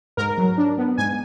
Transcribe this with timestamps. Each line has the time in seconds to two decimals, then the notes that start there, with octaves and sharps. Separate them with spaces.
0.17 G#2 A#4
0.38 F#3
0.58 D4
0.78 B3
0.97 G#2 G#5